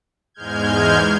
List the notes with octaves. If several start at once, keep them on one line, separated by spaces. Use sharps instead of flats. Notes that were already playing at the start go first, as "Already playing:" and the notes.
E2 G#2 G#3 F6 G6 G#6